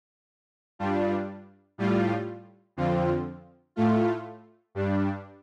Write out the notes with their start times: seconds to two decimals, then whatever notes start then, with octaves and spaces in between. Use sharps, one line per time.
0.79 G2 G3 D4 F4
1.78 A2 G3 F4
2.77 F2 D3 F3 C4 F4
3.76 A2 A3 F4
4.75 G2 G3 D4